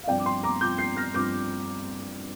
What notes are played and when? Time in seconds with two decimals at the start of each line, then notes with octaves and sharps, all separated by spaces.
0.03 F5
0.08 G2 F3 C4 D5 G5
0.18 D6
0.25 G5 C6
0.43 A#5 D6
0.61 G2 F3 C4 D6 G6
0.78 G6 C7
0.97 F6 A#6
1.14 G2 F3 C4 D6 G6